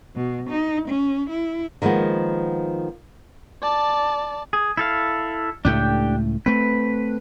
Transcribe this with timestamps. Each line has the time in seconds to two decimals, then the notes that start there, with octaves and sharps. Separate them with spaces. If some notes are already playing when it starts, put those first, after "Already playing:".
0.15 B2
0.49 D#4
0.88 C#4
1.29 E4
1.82 D#3 F3 G#3 A#3 B3
3.62 D5 A5
4.53 G#4
4.77 E4 A4 F5
5.65 C#2 A2 A3 D4 G4 G5
6.46 A3 C4 B4